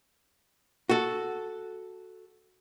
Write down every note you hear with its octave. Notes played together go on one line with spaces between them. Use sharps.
F#4 A4